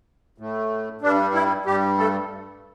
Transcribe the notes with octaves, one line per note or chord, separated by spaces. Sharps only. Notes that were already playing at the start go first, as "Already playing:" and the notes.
A2 A3
G2 G3 D4
E4
G2 G3 G4
A3 A4